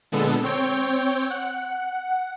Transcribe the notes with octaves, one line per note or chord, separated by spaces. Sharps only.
A#2 D3 G#3 B3 A4
C4 C#5 G5
F#5